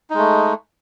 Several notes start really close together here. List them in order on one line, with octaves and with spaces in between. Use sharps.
D#4 G#3 A3